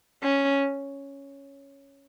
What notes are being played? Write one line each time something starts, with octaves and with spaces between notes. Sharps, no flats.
C#4